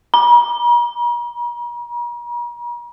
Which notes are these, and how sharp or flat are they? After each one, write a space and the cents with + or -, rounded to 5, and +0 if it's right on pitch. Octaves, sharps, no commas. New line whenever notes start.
A#5 +45